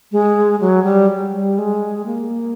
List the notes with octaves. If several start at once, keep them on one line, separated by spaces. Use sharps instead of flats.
G#3
F#3
G3
G3
G#3
A#3